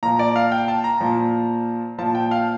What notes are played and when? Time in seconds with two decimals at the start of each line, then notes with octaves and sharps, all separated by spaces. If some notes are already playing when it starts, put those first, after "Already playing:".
0.03 A#2 F3 A#5
0.19 D5
0.36 F5
0.52 G5
0.68 A5
0.84 A#5
1.01 A#2 F3
1.98 A#2 F3 A5
2.15 G5
2.31 F5